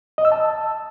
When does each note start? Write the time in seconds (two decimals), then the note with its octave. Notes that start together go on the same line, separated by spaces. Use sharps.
0.18 D#5
0.25 E6
0.32 A5